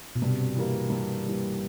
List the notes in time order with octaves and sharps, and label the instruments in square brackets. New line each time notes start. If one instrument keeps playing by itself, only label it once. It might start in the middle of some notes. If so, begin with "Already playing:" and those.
[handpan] B2
[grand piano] G2 [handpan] C3
[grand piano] E3 G3 A#3
G2
E3 G3 A#3